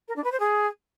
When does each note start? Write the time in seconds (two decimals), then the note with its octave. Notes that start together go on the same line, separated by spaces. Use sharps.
0.08 A#4
0.16 D4
0.24 B4
0.31 C5
0.39 G#4